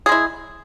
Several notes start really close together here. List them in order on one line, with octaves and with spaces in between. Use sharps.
G#4 G#3 E4